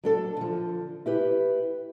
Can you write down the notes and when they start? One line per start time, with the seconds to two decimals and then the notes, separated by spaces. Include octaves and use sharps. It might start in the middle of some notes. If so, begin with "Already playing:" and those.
0.03 F#3 D4 A4
0.37 D3 F3
1.06 E4 G4 B4